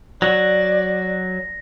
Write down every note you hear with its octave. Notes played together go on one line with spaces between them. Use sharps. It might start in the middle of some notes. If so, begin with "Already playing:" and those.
F#3 F#4 D5 A#6